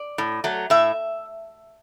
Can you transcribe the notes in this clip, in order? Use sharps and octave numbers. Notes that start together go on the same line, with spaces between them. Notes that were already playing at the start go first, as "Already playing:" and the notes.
Already playing: D5
A2
F#3 A3
A2 E5